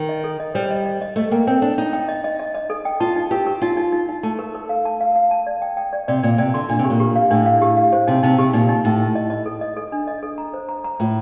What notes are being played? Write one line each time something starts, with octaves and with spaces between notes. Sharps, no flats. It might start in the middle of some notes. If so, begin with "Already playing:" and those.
Already playing: D#3
D#5
A4
D#5
G3 C5
D#5
D#5
D#5
A3 D#5
A#3 G5
C4 G5
D4 G5
D#4 G5
G5
D#5
D#5
D#5
D#5
A4
G5
F4 A5
D#4
G4 A#4
A#4
D#4 F4
D#4
D#4
D#4
A3 A5
A#4
A#4
F5
A5
F5
F5
A5
D5
G5
G5
D5
C3 D5
A#2 D5
C3 D5
D3 C6
A#2 D4
C3
G4
A#2
G4
F5
A2 D4
F5
G4
F5
C5
C3 D#4
C3 D#4
C3 G4
A#2 D#4
D#4
A2 D#4
D#4
D#5
D#5
A4
D#5
A4
D4
D#5
A4
A#5
C5
A#5
A#5
A2 F4